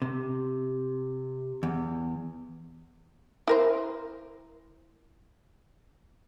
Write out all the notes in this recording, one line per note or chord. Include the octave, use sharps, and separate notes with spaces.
C3
E2
E4 A#4 C5